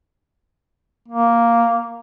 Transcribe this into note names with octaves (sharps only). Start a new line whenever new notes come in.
A#3